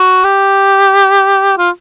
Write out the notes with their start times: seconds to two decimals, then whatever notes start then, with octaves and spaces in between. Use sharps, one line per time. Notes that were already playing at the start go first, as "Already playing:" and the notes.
Already playing: F#4
0.24 G4
1.58 F4